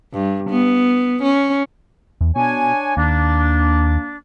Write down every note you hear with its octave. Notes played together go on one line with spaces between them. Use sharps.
G2
B3
C#4
E2
B2 D4 C#5 G#5
D#2 A#3 D4